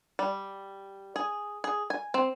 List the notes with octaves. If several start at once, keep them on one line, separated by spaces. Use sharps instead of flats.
G3
G#4
G#4
G#5
C4